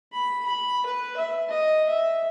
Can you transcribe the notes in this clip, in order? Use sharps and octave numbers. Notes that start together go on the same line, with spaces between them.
B5
B5
B4
E5
D#5
E5